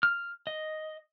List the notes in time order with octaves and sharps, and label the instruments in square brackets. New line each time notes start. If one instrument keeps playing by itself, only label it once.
[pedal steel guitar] F6
D#5